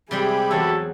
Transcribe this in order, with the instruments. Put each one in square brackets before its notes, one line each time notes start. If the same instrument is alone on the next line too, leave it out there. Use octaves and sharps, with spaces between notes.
[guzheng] C3 G3 G#3 [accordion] G4 E5 B5 [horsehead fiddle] G#4
[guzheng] E2 F#3 [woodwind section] F#4 A4